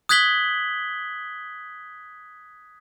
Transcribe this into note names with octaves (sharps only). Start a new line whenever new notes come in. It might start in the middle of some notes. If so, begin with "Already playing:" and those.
D#6 F#6 G#6 B6 F#7 G7